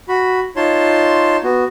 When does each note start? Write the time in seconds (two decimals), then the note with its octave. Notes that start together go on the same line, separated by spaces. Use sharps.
0.08 F#4 B5
0.56 D#4 F4 C#5 A5 C6
1.44 B3 F#4